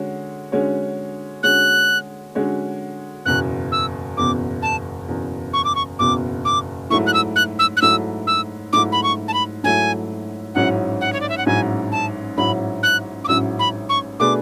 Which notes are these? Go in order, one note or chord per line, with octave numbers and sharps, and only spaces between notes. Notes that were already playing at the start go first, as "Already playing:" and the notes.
Already playing: D3 G#3 C#4 F#4 C#5
D3 G#3 C#4 F#4 C#5
D3 G#3 C#4 F#4 C#5 F#6
D3 G#3 C#4 F#4 C#5
F#1 E2 B2 F#6
E6
F#1 E2 B2 D6
A5
F#1 E2 B2
C#6
D6
C#6
F#1 E2 B2 D6
D6
G#2 F#3 A3 E4 C#6
F#6
E6
F#6
E6
F#6
G#2 F#3 A3 E4 E6
E6
G#2 F#3 A3 E4 D6
B5
C#6
A5
B5
G#2 F#3 A3 E4 G#5
A1 G#2 F#3 C#4 E4 F#5
F#5
C#5
D5
E5
F#5
A1 G#2 F#3 C#4 E4 G#5
A5
A1 G#2 F#3 C#4 E4 B5
F#6
D6
A1 G#2 F#3 C#4 E4 E6
B5
C#6
B2 A3 D4 G#4 B4 D6